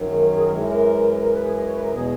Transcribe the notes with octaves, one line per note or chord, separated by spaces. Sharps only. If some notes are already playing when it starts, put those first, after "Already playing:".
Already playing: F#2 D#3 F#3
G#3
A#3
G#4
A#4
F#2 E3 G#3
A#4
A#4
B4
G#4
D#5
C#5
B4
A#4
E2 B2 G#3 G#4